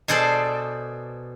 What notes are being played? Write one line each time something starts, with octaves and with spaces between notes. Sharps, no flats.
B2 G#4 A4 C5 D5